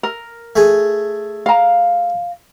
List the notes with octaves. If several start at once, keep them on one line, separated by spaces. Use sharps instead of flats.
A#4
A3 G#4
F5 A#5